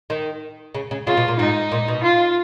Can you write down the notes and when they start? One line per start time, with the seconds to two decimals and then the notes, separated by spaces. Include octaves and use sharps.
0.10 D#3
0.75 C#3
0.91 C#3
1.07 C#3 F4
1.17 B2
1.28 A#2
1.39 G#2 D#4
1.72 A#2
1.88 B2
2.03 F4